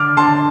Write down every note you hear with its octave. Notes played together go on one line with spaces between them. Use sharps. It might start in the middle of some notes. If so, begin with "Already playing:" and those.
Already playing: D3 D4 D6 F6
D3 A5 C6